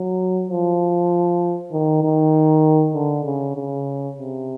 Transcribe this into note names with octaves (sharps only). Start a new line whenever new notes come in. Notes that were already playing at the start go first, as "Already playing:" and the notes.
Already playing: F#3
F3
D#3
D#3
D3
C#3
C#3
C3